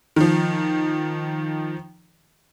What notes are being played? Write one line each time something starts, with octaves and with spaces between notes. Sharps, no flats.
D#3 F3